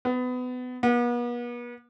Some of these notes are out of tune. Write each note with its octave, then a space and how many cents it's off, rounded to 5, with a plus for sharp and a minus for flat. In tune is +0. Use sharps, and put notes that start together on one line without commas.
B3 +25
B3 -40